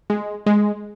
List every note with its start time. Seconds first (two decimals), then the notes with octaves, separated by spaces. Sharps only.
0.10 G#3
0.46 G#3